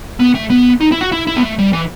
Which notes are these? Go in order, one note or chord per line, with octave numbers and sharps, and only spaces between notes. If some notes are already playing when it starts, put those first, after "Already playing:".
B3
A3
B3
D#4
E4
F#4
E4
E4
B3
A3
G3
E3